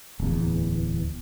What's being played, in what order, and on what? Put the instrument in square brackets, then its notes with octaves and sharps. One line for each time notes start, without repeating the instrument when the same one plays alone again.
[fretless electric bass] D1 E2